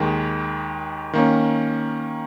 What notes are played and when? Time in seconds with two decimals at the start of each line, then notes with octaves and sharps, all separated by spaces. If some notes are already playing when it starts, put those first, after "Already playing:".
Already playing: D#2 D#3 G#3
1.13 D#3 A#3 C#4